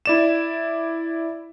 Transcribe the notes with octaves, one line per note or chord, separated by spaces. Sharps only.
E4 D5 E7